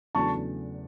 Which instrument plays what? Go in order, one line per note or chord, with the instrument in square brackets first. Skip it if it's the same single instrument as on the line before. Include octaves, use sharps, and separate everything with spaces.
[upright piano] E2 C#3 F#3 A3 D4 [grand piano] A5 C#6